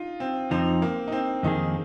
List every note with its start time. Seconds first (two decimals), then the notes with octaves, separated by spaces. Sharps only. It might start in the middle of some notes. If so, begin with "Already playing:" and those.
Already playing: D#4 F4
0.20 C4
0.51 F2 F3 C4 D#4
0.82 A#3
1.08 D#4
1.12 C4
1.43 F2 D#3 A#3 D#4 G#4